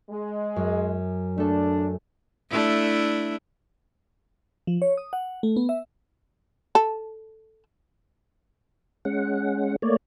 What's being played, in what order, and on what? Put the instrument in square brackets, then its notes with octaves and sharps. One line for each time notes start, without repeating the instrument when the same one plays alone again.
[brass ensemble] G#3
[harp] F#2
[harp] A3 A4 [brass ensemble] D4
[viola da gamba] A3 D4 E4
[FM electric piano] F3
C#5
D#6
F#5
A3
B3
E5
[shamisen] A4
[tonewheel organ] G#3 C#4 F#5
A3 A#3 C#5 D5